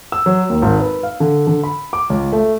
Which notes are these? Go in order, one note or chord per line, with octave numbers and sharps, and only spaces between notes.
E6
F#3
D#2
G#1
B4
F5
D3
D3
B5
D6
C#2
A3